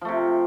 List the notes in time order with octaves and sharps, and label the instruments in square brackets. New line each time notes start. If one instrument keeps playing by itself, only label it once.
[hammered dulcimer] F3
A3
C3